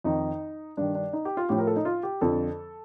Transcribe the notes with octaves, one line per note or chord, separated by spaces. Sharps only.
F2 D#3 D#4
G2 D#3 D4
D4
D#4
G4
F4
A2 F3 G4
A#4
A4
D#4
F4
G4
F2 D3 F3 A4